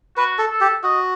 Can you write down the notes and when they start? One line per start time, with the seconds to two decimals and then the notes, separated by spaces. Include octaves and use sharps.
0.17 F#4 B4
0.39 A4
0.50 A4
0.61 G4
0.83 F#4 D#5